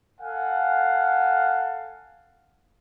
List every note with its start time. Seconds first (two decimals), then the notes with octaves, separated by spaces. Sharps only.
0.21 A4 F5 F#5 G#5